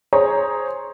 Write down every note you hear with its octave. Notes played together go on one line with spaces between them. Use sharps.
G#4 C5 C#5 A#5